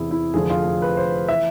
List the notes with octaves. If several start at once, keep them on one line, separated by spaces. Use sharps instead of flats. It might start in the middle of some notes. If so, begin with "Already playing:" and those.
Already playing: E2 C3 E3 E4 G#4
E4
F1 F2 D3 F3 G#4
F4
G#4
B4
C5
E3 E5